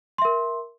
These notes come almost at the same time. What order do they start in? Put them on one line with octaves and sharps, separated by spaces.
C6 E5 A#4